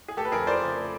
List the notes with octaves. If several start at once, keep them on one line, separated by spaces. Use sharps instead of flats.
G#4
A3 G4 A4
B4
F2 G#4 A#4
F3 C5 D5
C#3
A3